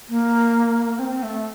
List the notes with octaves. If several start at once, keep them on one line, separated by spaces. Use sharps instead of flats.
A#3
C4
A3